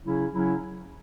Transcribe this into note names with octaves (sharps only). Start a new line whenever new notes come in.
C#3 F#3 C#4 E4
C#3 F#3 C#4 E4